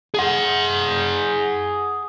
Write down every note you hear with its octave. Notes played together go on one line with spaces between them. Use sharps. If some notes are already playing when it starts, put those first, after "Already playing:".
G#4 F#5